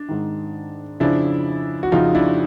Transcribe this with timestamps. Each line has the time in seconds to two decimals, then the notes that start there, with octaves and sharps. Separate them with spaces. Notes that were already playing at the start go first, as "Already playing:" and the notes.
Already playing: D4
0.09 G#2 D#3
1.00 F2 C#3 F3 D4 E4
1.83 F#4
1.92 F2 C#3 F3 D#4 F4
2.15 D4 E4